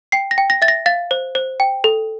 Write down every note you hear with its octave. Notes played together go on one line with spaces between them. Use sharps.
G5 C7
A#6
G5
A#6
E5 A6
A#6
F5 A6
C5
C5
G5
A4